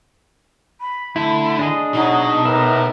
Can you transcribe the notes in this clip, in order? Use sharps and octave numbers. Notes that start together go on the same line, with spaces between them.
B5
D3 A3 E4
D4 G#4 D#5
B2 F#3 D#4
A2 A#4 B4 E5